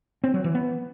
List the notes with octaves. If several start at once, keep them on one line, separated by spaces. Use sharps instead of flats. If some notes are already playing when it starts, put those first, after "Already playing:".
C4
F#3
E3
B3